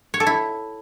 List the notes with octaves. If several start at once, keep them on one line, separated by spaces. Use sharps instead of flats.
C#5
A4
E4